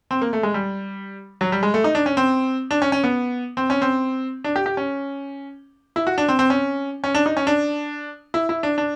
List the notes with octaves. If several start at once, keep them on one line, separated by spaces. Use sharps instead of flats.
C4
A#3
A3
G#3
G3
F#3
G3
G#3
A3
D#4
D4
C#4
C4
D4
C#4
C#4
B3
C4
C#4
C4
D4
G4
G4
C#4
E4
F#4
D4
C4
C4
C#4
C#4
D4
D#4
C#4
D4
E4
E4
D4
D4